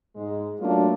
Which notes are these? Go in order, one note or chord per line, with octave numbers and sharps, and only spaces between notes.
G#2 G#3
F#3 A3 A#3 D4 F4